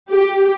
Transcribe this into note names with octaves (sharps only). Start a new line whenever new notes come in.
G4